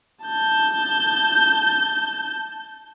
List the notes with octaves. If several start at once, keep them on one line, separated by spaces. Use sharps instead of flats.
A5 G6